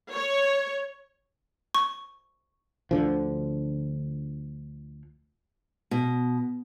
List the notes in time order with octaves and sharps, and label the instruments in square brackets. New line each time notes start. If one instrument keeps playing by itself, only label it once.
[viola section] C#5
[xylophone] C#6
[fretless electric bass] D2 D3 F3
[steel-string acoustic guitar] B2